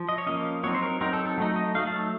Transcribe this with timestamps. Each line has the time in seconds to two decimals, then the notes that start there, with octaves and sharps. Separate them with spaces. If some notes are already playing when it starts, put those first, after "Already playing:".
Already playing: F3
0.09 D#5
0.18 C#5
0.26 F3 A#3 C#4 D#5
0.64 F#3 C4 D#4 C#5
0.74 C5
0.83 A#4
1.01 F#3 C4 D#4 A#4
1.13 A4
1.25 A4
1.38 F#3 A3 D#4
1.56 D#5
1.75 F#3 A3 D#4 F5
1.87 A5